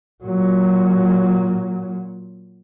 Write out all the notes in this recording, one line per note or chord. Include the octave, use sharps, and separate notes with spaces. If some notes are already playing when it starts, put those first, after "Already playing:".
A#2 F#3